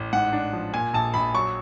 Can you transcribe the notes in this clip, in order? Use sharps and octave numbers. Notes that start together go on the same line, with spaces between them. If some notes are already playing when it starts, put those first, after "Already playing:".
Already playing: A1
G#2 F#5
D4
F3
A#2 G#5
A#1 A5
A#1 B5
F#3 C#6